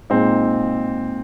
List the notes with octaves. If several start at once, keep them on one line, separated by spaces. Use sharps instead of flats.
A#2 G#3 C4 D#4